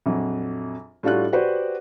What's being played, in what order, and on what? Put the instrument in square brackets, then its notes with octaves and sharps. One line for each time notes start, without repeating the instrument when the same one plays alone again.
[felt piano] A#1 F2 F#3
A2 G3 D4 F4 F#4 F#6
F#4 G4 B4 C5 D5